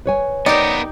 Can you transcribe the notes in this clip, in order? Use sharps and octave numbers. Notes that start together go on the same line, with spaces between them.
B4 C#5 G#5
B3 D#4 G4 A#4 D5